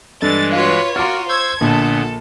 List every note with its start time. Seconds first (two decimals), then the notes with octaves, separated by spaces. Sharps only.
0.22 G2 E3 G#3 A4 A6
0.52 F4 F#4 B4 C#5 D#5 F5
0.96 F4 F#4 A#4 A#5 D6 F6 A6
1.29 C5 C#6 E6 G6 G#6
1.61 A#1 A#2 D3 B3 A4